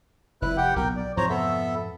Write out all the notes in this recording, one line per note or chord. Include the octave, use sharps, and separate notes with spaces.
F1 E4 B4 F#6
G4 F#5 G5
B1 A#2 A#4 G5
D5
F2 G#2 C3 C5 C#5 A#5
B3 A4 E5